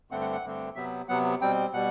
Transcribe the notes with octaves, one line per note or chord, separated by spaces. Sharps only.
G2 D3 A3 C4 F#5
F#5
F#5
G2 D3 A3 C4
C3 F#3 B3 E5
C3 F#3 B3 F#5
B2 G3 C4 G5
B2 G3 F#5